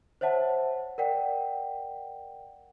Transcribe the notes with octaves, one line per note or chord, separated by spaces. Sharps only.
C5 C#5 E5 F#5 A5
A#4 D5 F#5 G5